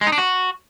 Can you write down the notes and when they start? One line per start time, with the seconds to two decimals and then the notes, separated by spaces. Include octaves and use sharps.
0.01 G#3
0.07 D#4
0.12 D4
0.18 F#4